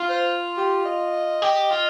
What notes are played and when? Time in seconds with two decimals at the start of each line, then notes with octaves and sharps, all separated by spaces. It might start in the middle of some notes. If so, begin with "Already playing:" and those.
Already playing: F4
0.09 C5
0.57 G4
0.85 D#5
1.42 G4
1.71 F4